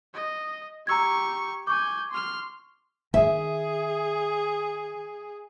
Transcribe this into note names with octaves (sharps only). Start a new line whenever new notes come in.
D#5
G4 A#5 C#6 E6 G#6
G#5 C#6 D6 G6
C6 F6
D#3 G#4 E5